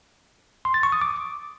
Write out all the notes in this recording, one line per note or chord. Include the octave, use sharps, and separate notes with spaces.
C6
A6
C#6
D#6
D6